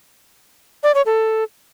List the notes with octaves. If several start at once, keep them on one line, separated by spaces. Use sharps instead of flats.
D5
C#5
A4